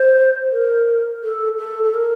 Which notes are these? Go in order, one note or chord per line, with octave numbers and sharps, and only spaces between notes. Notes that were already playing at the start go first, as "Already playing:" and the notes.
Already playing: C5
A#4
A4
A4
A4
A#4